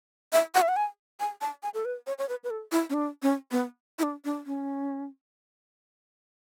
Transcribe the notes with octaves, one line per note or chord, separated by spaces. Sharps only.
E5
F#5
E5
F#5
G#5
G#5
A5
G#5
A4
B4
C#5
C#5
B4
B4
A4
E4
C#4
D4
C#4
B3
E4
D4
D4
C#4